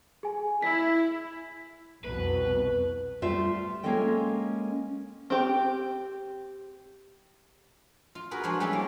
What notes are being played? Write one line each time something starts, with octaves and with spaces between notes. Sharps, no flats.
G#4 G#5
E4 B6
C2 F2 B2 B4
G3 A3 F4 C5 E5
G#3 A#3 C#4 A4 D#5 G5
C4 G4
F4
F#4 G#4 A#4 B4
F3 G#3 D4 F#4 C5 C#5
G3 G#3 B3 C#4 E4 G4
A#3